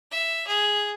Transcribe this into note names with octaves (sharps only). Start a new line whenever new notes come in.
E5
G#4